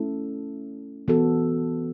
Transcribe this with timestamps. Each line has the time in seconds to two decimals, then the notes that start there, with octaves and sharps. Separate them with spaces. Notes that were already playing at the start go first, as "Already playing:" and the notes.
Already playing: A3 C#4 E4 A4
1.08 E3 B3 F#4 A4